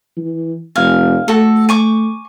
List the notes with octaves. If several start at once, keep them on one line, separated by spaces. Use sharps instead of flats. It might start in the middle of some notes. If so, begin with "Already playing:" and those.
E3
F1 F5 G#5
A3 F#4 A4
G#5 C#6 D6